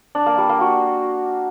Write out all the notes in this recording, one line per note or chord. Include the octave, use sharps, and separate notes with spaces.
D4
A#3
G3
A#3
F#4